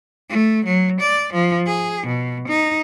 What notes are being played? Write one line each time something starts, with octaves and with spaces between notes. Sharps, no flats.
A3
F#3
D5
F3
G#4
B2
D#4